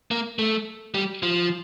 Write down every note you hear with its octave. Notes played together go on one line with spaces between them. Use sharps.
A#3
A3
G3
F3